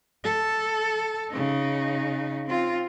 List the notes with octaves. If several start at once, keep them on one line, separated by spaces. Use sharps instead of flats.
A4
C#3 D#4
C4 F4